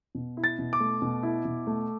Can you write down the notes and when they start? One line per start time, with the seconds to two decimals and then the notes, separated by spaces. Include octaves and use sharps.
0.15 B2
0.37 E4
0.44 A6
0.59 B2
0.73 D6
0.80 A3
1.02 B2
1.23 E4
1.45 B2
1.67 A3